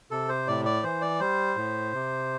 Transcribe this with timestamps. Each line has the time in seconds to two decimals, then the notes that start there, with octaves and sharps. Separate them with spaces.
0.11 C3 A4
0.29 C5
0.47 A2 D5
0.65 D5
0.83 E3 C5
1.01 D5
1.20 G3 C5
1.56 A2
1.93 C3